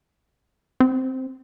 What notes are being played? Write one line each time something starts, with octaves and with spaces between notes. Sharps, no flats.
C4